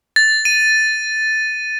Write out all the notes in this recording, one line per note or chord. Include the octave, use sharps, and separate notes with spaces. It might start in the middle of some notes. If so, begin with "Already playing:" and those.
A6
D#7